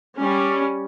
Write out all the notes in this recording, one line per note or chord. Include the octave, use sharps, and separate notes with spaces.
G3 C#4